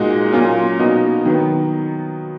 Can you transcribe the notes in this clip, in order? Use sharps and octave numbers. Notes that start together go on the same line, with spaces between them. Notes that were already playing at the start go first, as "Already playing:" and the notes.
Already playing: A#2 G#3 D#4 F#4
A#2 F#3 C#4 F4
B2 A#3 D#4 F#4
D#3 F#3 B3